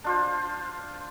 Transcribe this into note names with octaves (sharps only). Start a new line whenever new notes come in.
D4 F4 C5